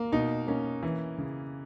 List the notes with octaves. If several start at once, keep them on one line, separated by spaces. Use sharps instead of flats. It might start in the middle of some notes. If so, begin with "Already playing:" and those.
Already playing: A#3
B2 D#4
A#3 C#4
E3
C#3